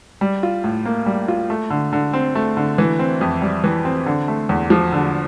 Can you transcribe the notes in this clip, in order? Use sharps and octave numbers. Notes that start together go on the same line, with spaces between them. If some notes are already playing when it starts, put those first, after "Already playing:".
G3
F4
A2
A#3
G3
F4
A3
D3
D3
C4
A3
D3
E3
C4
F2
G3
E3
C4
D3
A3
E2
F3
D3